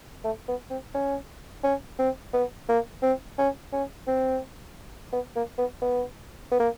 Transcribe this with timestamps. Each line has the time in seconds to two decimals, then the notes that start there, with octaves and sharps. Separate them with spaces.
0.24 A3
0.48 B3
0.70 C4
0.94 C#4
1.64 C#4
1.99 C4
2.33 B3
2.69 A#3
3.02 C4
3.38 C#4
3.73 C#4
4.07 C4
5.12 B3
5.36 A#3
5.58 B3
5.82 B3
6.51 B3
6.60 A#3